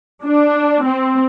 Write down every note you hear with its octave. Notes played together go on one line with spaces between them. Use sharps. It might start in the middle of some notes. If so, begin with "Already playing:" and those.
D4
C4